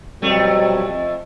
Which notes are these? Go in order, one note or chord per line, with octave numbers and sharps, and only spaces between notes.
F2 B2 F#3 G3 A3